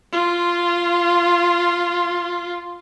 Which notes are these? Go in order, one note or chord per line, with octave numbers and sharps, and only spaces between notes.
F4 C6